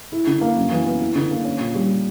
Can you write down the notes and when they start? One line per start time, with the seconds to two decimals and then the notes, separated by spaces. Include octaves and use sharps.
0.12 E4
0.27 D3
0.41 A#3
0.56 F#2
0.72 E3
0.86 B3
1.01 E4
1.16 D3
1.31 A#3
1.45 C#4
1.60 A#2
1.75 G3